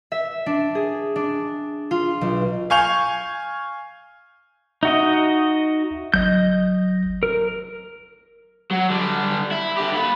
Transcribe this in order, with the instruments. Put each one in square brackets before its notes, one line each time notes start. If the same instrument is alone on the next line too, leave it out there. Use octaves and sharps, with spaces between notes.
[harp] E5
D4
G#4
D4
F4
B1
[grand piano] F5 G#5 C#6 G6 F7
[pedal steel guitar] D#4 F#4 D#5 [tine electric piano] E5
[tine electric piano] G1 F#3 [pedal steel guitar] D#5 G6
[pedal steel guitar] A#4
[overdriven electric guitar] F#3
D3 G3
E4
D3 G4
A#3 B5